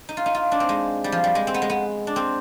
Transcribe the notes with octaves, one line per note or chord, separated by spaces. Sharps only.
D#4
F4
D#4
F4
D4
C4
G#3
G3
F3
G3
G#3
C4
B3
G#3
B3
D4
C4